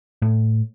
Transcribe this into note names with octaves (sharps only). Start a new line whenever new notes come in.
A2